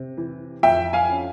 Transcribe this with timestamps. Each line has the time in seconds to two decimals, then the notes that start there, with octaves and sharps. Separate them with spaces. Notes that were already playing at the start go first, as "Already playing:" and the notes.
Already playing: C3
0.17 E3
0.63 F2 E5 G5
0.93 F5 G#5
1.10 C#4